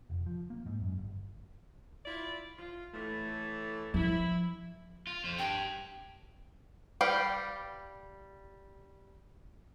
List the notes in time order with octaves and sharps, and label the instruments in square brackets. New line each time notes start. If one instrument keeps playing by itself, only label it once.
[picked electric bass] F1
F3
A#3
G#2
F#2
G1
[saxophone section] E4 F4 D5
F4
A2 E3 A3
[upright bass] F3 [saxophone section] E4
[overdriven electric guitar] F4
F2 C5
[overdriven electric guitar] G4 A5 [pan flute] G5
[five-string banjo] G3 B4 F5 G5